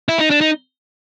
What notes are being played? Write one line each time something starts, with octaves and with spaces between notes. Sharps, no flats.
E4
D#4
D4
D#4